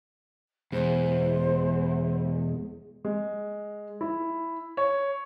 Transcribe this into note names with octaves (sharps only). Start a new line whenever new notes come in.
E2 B2 G#3 C5
G#3
E4
C#5